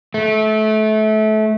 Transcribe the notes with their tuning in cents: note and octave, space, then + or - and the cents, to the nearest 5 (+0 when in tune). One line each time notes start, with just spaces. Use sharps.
A3 -25